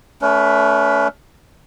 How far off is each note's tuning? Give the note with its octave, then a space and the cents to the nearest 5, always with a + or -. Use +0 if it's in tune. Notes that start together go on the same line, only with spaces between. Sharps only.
A3 +0 C#4 +35 B4 +0